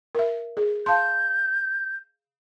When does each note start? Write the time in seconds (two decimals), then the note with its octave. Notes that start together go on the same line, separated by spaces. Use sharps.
0.15 A#4 E5
0.57 G#4
0.86 F5 A5 C6 G6